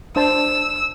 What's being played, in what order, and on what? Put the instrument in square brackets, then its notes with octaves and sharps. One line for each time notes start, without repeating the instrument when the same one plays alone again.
[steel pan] D4 C5 A5 [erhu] E6